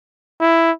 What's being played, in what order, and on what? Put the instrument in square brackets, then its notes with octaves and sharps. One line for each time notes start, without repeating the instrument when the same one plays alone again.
[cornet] E4